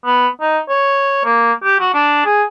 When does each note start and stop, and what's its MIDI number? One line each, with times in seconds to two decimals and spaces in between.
0.05 0.28 59
0.41 0.59 63
0.69 1.25 73
1.25 1.53 58
1.64 1.78 67
1.80 1.91 66
1.94 2.23 62
2.25 2.44 68